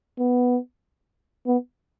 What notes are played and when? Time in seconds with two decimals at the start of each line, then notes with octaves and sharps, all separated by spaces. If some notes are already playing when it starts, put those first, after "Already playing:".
0.19 B3
1.46 B3